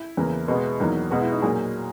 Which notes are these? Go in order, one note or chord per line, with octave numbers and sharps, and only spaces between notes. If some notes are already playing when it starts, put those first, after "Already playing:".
Already playing: E4
E2 C#3 E3 A#3
B2 G#3 B3
E2 D#3 F#3 A#3
B2 G#3 B3 F#4
E4
D#4
A#2 F#3 A#3 G#4